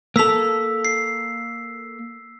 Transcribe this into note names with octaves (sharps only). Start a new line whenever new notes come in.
A#3 A4 E6 B6 F7
C7